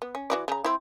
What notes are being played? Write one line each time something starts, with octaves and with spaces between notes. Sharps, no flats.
B3
C#4
E3 F#4 D5
C#3 A#5
C4 E4